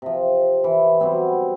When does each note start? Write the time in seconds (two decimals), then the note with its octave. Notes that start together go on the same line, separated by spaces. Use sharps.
0.02 C3 F3
0.64 E3
1.00 F#3 G3 B3 C4